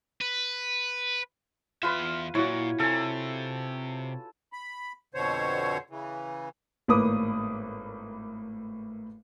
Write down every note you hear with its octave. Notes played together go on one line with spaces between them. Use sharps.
B4
E2 F4 B4 E5
A#2 E4 F#4 C#5
C3 A4 G#5
B5
F2 B2 D3 C5 C#5
C#3 E3
G#1 A2 A#3 B4 D6 D#6